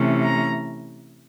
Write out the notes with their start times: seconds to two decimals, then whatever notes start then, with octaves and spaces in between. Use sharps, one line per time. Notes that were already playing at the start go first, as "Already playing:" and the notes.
Already playing: C3 E3 A3 C#4
0.23 A#5